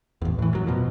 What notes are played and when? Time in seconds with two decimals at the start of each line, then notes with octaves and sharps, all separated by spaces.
0.22 A1 E2
0.39 A2 E3
0.53 F#2 F#3
0.67 B2 F3